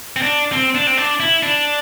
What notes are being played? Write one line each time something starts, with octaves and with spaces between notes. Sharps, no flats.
C4
D4
C4
D4
C4
D4
E4
D4